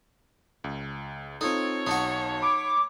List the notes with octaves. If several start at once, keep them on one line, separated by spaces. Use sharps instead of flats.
C#2
C4 D#4 F4 A4 C#5
B1 D#4 F#4 A5 C#7
B5 D6 D7